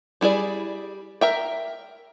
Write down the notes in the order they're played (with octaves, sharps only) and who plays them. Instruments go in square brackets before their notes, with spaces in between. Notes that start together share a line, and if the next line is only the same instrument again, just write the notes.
[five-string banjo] G3 E4 G#4 D5
A#4 E5 G5